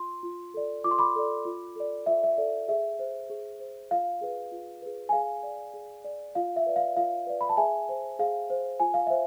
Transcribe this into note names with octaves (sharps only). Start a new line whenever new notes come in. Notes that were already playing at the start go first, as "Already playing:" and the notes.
Already playing: F4 C6
F4
A4 D5
F4 D6
C6
B5 D6
A4 D5
F4
A4 D5
F4 E5
E5
A4 D5
G#4 E5
C5
G#4
C5
F4 F5
G#4 B4
F4
G#4 B4
G#5
G#4 F5
D5
G#4
D5
F4 F5
E5
B4 D5
F5
F4 F5
B4 D5
B5
A5
G#4 E5 G#5
C5
G#4 F5
C5
F4 G#5
F5
C5 E5